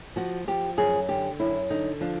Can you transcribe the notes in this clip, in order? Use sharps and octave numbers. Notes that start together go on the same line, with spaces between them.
F3 F#4
F3 G4
F#2 G#4
D3 G4
F#2 E4
D3 D#4
F3 D4